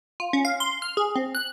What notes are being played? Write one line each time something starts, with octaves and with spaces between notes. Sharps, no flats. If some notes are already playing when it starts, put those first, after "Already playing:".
F4
C#4
F5
C6
F6
G#4
C4
F#6